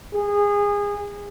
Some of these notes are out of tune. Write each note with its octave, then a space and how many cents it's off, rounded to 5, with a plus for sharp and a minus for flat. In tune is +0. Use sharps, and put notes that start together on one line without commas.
G#4 -25